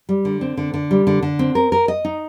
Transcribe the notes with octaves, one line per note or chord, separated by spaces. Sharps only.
G3
D3
C4
D3
D3
G3
D3
D3
C4
A#4
A#4
D#5
D#4